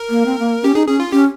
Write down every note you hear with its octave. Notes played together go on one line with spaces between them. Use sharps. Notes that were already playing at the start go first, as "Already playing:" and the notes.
Already playing: A#4
A#3
C4
A#3
C#4 G4
D#4 G#4
C#4 G#4
F4
C#4 G4